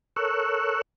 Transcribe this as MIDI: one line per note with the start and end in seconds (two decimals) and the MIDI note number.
0.16 0.82 69
0.16 0.82 70
0.16 0.82 73
0.16 0.82 85
0.16 0.82 88
0.16 0.82 90